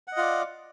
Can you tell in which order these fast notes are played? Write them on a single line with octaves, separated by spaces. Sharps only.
F#5 D#5 F4 D5